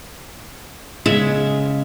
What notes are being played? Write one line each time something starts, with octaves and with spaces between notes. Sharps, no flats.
C#3 G#3 E5